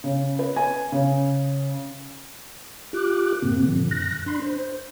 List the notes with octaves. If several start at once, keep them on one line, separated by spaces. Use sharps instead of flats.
C#3
B4
G#5
C#3
F4 G4 D6 F#6
F#2 A2 C3 A#3 C4
G2 A#2 D3 F3
F#2 F#6 A#6
D4 B5 C6
C5